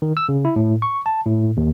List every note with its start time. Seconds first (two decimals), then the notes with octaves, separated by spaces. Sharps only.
0.02 D#3
0.17 E6
0.29 C#3
0.45 E4
0.56 A2
0.82 C#6
1.06 A5
1.26 A2
1.57 D#2